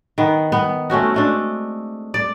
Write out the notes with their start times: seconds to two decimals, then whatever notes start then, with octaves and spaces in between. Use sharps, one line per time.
0.18 D#3 B3
0.52 B3
0.90 A3 C4 C#4 F#4
1.14 G#3 A3 D4
2.14 D5